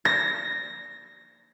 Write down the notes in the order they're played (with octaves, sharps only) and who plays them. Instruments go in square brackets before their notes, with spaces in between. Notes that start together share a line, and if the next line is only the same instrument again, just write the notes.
[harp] A#6